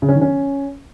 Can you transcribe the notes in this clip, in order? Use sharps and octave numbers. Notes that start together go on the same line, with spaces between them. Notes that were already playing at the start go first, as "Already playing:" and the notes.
C#3
C#4
D#3
C#4